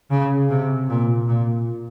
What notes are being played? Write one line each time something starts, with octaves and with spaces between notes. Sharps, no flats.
C#3
C3
A#2
A#2